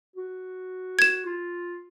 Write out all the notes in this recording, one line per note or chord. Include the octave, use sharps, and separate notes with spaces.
F#4
G#6 E7
F4